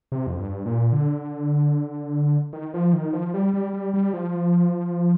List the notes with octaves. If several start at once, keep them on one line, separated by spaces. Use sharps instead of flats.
C3
F2
G2
A#2
D3
D#3
F3
D#3
F3
G3
G3
G3
G3
F3